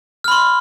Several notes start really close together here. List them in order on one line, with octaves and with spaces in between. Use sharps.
F6 B5 C6